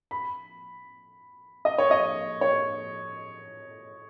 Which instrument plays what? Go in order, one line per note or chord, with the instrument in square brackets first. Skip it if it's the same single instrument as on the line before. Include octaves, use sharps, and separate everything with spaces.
[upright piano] B5
D#5
C#5
D#5
C#5